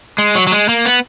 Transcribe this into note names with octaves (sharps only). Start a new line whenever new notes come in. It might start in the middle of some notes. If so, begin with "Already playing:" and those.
G#3
F#3
F#3
G#3
A#3
B3